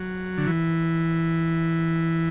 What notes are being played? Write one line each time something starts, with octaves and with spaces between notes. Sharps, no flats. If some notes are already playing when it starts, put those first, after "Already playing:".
Already playing: F#3
D3
E3